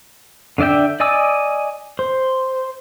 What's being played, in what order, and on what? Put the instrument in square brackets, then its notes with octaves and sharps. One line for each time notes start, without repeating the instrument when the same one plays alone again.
[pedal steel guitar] D3 D4 D5 E5 G5
D5 D#5 G#5 D6 E6
C5